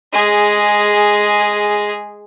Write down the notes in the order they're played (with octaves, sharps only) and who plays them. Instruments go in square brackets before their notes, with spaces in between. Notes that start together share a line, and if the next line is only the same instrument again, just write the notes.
[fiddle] G#3 G#4